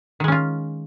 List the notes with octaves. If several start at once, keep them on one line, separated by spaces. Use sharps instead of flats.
D#3 G#3 C#4 F4